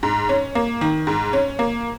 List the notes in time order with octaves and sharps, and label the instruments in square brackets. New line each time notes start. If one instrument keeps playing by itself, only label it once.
[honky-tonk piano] G#2
C#4
A#3
D#3
G#2
C#4
A#3